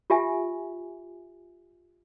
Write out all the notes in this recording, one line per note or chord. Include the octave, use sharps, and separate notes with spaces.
F4 G4 E5 G#5